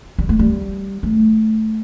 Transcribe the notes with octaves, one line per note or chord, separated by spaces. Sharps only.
G3
A3
G3
A3